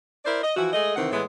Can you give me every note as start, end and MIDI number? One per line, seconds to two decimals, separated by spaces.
0.25 0.41 64
0.25 0.41 70
0.25 0.41 72
0.25 0.41 74
0.42 0.52 75
0.56 0.71 52
0.56 0.71 53
0.56 0.71 64
0.56 0.71 66
0.73 0.92 56
0.73 0.92 57
0.73 0.92 68
0.73 0.92 75
0.96 1.10 48
0.96 1.10 51
0.96 1.10 52
0.96 1.10 60
0.96 1.10 78
1.11 1.21 45
1.11 1.21 52
1.11 1.21 56
1.11 1.21 59